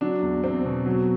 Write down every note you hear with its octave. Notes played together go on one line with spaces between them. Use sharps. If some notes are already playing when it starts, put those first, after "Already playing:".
F#3 D4
E2
E2 C4
B2
F#3